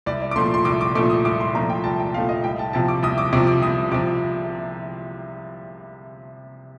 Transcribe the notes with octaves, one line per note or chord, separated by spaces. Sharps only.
C2 D5
D5
D6
A#2 F3 A3 C6
C6
C2 D6
D6
A#2 F3 A3 D6
D#6
C2 D6
C6
A#2 F3 A3 A#5
G5
C2 A5
G5
A#2 F3 A3 F5
D#5
C2 G5
A5
C3 F3 A5
D6
C2 D#6
D6
C3 F3 D6
D6
C2 D#6
C3 F3 D6